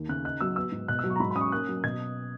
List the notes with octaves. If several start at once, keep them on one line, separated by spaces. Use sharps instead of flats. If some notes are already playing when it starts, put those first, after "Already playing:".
Already playing: D#2
C#3 F#6
D#4 F#6
F#3 E6
B3 E6
G#2
B2 F#6
E6
F#3
C#6
A#5
G#2 B5
B5
C#4 D#6
C#6
A#3 F#6
F#3
B2 G#6